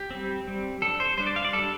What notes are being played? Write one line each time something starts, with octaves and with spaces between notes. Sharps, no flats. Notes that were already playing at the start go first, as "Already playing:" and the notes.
Already playing: G4
G3 C4
G3 C4
G3 D4 A4
C5
G3 D4 C5
D5
F5
D5
G3 D4 A4